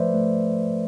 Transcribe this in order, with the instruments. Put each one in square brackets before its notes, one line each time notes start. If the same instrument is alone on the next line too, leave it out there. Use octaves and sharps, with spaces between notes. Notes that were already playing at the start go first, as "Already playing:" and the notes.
Already playing: [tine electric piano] F3 A3 B4 C5 D5 E5
A3